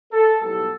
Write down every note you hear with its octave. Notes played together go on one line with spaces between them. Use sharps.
A4
B1 A2 G3 B3 A4